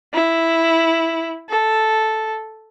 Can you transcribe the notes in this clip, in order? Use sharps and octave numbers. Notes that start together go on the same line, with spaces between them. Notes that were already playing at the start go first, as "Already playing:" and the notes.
E4
A4